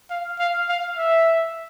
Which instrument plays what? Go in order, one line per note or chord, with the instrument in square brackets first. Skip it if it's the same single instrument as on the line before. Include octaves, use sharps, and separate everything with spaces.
[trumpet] F5
F5
F5
E5